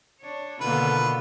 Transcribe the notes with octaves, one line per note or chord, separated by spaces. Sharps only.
D4 C#5
B2 D3 D#3 A#3 F4 B4